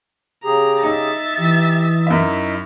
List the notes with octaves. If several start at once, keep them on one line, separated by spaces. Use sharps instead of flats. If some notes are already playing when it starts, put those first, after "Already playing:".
C#3 G4 G#4 A#5
D#4 E5 A6
E3 G4
F#2 D#4 E4 E5